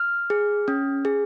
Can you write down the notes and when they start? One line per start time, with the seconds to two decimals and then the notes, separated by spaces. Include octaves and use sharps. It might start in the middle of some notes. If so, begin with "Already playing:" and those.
Already playing: F6
0.30 G#4
0.68 C#4
1.05 G#4